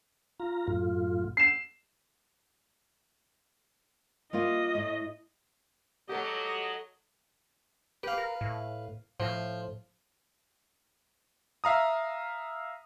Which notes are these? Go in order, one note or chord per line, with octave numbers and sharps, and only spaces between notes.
F4 A#5
F#2 A2 F4
C7 E7
G3 A#3 F4 D#5
A2
F#3 G4 A4 D#5 F#5
G4 B4 F5
A#4
A2
A2 F3
E5 F5 A#5 D#6